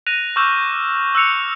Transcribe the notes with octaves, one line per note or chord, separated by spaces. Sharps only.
F#6 A#6 D#7 F7
C#6 D6 E6 F6 G6 E7
E6 F#6 C#7 F7